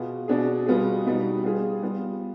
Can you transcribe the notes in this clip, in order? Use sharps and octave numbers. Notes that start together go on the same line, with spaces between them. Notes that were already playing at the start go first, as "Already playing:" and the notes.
Already playing: B2 B3 F4 G#4
B2 B3 D4 G#4
B2 G3 B3 F4 G#4
B2 G3 B3 D#4
G3 B3 F4 G#4
G3 B3 F4